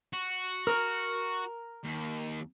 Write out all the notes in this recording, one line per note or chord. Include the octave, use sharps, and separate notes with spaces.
F#4
A#4
D#2